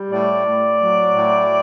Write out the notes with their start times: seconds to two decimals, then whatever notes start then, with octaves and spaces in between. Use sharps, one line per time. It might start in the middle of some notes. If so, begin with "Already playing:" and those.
Already playing: G3
0.10 A2 D5
0.46 A2
0.80 F#3
1.15 A2